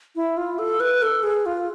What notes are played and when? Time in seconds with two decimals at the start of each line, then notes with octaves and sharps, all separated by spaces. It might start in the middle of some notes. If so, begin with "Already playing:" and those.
0.16 E4
0.37 F4
0.59 A4
0.80 B4
1.02 A4
1.23 G#4
1.46 F4